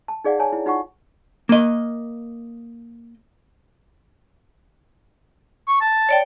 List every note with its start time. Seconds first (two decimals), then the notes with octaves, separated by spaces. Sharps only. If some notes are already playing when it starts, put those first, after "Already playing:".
0.08 A5
0.24 D#4 G#4 D5 F5 F#5
0.39 C#5 G#5 A5
0.53 E4
0.66 D#4 F4 F#5 C#6
1.49 A#3 D#5
5.68 C#6
5.81 A5
6.09 C#5 D5 G5